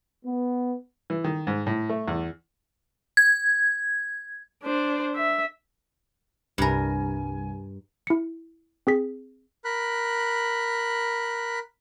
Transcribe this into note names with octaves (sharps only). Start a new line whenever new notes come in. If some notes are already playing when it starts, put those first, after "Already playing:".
B3
E3
D#3
G#2
A2
A3
E2
G#6
D4 C5
E5
C2 G2 C3 A#4 G#5
E4 C#7
C4 G#4 B6
A#4 B5 F#6